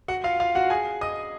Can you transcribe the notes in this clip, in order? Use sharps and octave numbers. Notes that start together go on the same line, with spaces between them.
F#4 F#5
F4 F5
F4 F5
F#4 F#5
G#4 G#5
D#5 D#6